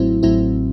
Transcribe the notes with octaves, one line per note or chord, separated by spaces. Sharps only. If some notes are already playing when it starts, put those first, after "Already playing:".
Already playing: A1 A2 F#3 C4 E4
A1 A2 F#3 C4 E4